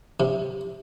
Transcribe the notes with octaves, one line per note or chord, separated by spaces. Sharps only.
C3